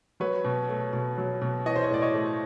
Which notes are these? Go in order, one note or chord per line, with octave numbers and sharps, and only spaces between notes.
F#3 B4 C#5
B2
A3
B2
F#3
B2
E3 C#5 D#5
C5
C#5
A2 D5
C#5 D#5
A3